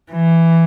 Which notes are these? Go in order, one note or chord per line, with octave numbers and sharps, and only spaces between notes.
E3